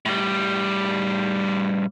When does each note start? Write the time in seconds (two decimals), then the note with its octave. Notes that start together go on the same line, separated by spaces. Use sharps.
0.06 A2 G3